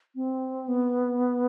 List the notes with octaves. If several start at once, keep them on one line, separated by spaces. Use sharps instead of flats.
C4
B3